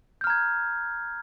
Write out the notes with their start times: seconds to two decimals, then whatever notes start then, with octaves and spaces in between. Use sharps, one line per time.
0.21 G6
0.24 F6
0.27 A#5
0.30 G#6